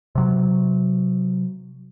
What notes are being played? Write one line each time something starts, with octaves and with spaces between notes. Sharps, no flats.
C3 F#3